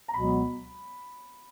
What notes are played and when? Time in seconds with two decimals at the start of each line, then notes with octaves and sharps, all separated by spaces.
0.08 A#5
0.14 C#2 B2 F#3 B3 B5